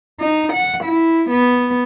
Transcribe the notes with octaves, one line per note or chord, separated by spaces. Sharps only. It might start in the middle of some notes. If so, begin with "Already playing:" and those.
D#4
F#5
E4
B3